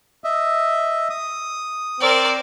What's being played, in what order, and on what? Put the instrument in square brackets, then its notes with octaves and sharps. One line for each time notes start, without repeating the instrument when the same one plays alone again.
[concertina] D#5 E5
D#6
[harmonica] C4 [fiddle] A#4 D5